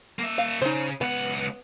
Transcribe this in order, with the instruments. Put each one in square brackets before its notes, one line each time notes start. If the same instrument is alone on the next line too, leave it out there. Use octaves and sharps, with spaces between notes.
[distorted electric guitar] A#3 E5
[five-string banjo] F5
[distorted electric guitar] C#3 [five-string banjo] D#4 C5
[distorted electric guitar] C#2 F#5 [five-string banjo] B3